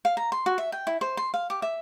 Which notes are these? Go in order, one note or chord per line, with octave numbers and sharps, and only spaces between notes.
F5
A#5
C6
F#4
E5
G5
E4
C5
C6
F5
G4
E5